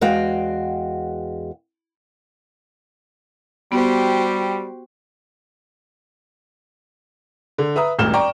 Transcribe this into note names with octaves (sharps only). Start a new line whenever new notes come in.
E2 G#3 F#4 F5 G5
G3 B3 F#4 G4 C5
D3
B4 E5 A#5 D#6
D#1 G#1 A2 F6 E7 G7
D5 G5 A#5 C#6